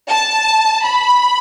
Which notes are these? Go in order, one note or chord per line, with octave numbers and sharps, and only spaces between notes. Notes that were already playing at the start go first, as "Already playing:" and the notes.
A5
B5